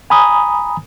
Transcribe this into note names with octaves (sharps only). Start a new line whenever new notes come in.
G#5 A#5 B5 D#6